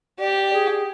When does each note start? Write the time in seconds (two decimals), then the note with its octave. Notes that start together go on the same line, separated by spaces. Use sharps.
0.19 G4 D5
0.53 G#4